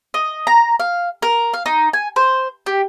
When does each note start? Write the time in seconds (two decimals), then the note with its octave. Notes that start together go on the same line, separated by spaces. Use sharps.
0.14 D#5
0.47 A#5
0.80 F5
1.22 A#4
1.54 F5
1.66 D#4
1.93 G#5
2.16 C5
2.66 G4